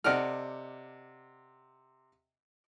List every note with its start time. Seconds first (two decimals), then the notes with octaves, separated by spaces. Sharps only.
0.04 C3 A4 D5 D#5 F#5 F6